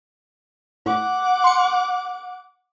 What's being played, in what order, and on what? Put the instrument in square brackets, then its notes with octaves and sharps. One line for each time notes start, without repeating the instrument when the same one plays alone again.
[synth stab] A2 [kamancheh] F#5 D6
[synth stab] C6 C#7